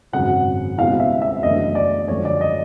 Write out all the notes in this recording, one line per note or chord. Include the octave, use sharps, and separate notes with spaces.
G#1 F#2 C#3 F#3 F#5
C#2 B2 G3 C4 E4 F5
E5
E5
F#2 C#3 E3 A3 D4 D#5
D5
F#2 D3 F3 G#3 C#5
D5
D#5